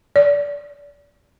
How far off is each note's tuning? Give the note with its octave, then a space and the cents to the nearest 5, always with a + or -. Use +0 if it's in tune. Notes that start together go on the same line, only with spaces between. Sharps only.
D5 -20